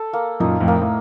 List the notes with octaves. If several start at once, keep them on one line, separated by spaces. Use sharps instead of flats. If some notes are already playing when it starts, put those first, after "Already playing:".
Already playing: A4
A#3
F#2 A#2 D#4
F2 A2
A#3
A2